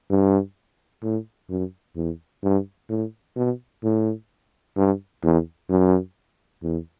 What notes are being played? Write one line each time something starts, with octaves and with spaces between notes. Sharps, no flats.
G2
A2
F#2
E2
G2
A2
B2
A2
G2
E2
F#2
E2